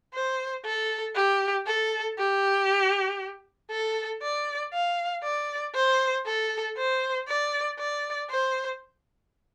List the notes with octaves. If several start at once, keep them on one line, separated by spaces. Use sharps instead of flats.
C5
A4
G4
A4
G4
A4
D5
F5
D5
C5
A4
C5
D5
D5
C5